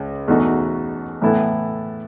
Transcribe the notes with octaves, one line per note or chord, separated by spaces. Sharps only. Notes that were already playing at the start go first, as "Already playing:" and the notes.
Already playing: C#2
E2 B2 A3 D#4 F#4
A2 E3 B3 E4 A4